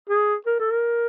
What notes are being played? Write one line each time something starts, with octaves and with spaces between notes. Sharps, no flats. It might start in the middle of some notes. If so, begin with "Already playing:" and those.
G#4
A#4
A4
A#4